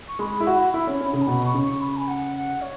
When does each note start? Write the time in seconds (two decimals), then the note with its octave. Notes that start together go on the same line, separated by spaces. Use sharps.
0.08 C#6
0.19 G#3 B5
0.40 E4
0.47 F#4
0.74 E4
0.87 C#4
1.00 C#4
1.13 C#3
1.22 G#5
1.27 B2 B5
1.45 C#6
1.54 C#3
1.63 C#6
1.80 B5
1.97 G#5
2.07 F#5
2.35 F#5
2.61 C#5